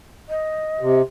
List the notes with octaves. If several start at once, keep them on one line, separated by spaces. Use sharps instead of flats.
D#5
C3